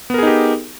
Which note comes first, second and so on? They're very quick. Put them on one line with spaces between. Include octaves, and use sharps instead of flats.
B3 A#4 G#4 D#4 G4